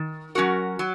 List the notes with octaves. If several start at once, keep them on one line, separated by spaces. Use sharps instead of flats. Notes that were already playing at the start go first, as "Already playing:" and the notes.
Already playing: D#3
F#3 C#4 F#4 A#4
F#3